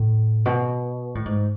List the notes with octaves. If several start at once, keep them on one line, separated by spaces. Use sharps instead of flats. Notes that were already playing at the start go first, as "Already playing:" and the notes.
Already playing: A2
B2
A2
G#2